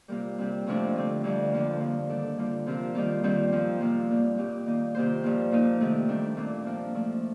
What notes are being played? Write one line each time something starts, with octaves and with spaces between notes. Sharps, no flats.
C3 G3 A#3 F4 A#4
C3 G3 C4
F2 C3 F3 A3 D4
D3 A3 C4
F2 D3 G3
D3 F3 A#3
G2 F3 A#3
D#3 G3 D4 A4
D3 G3 A#3 F4
C3 F3 C4 F4 A#4
D#3 G3 A#3 F4
G2 D#3 G3 C4 F4
F3 C4 D#4
C3 F3 A#3 F4
A2 G3 A#3 F4
A#2 G3 C4 D#4 G4
D#3 A#3 D#4
C3 D#3 A#3 F4 C5
G2 F3 A#3 F4
A#2 F3 A#3 D#4
C3 D#3 A3
F2 D#3 G3 D4
A#2 A3 C4
F3 A#3 D4
F3 A3 D4